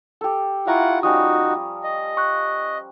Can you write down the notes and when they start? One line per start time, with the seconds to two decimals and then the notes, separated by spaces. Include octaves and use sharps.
0.21 G4 A4
0.67 E4 F4 F5 F#5 A#5 C#6
1.03 F3 G3 C#4 D#4 F#4 D#6
1.84 D#5
2.17 C#6 F#6